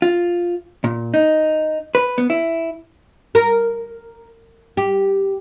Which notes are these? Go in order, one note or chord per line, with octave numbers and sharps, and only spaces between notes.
F4
A#2
D#4
B4
B3
E4
A#4
G4